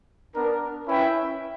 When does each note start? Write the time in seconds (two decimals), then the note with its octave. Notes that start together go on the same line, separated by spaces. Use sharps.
0.34 B3 D4 A#4
0.87 C#4 E4 B4 E5 G5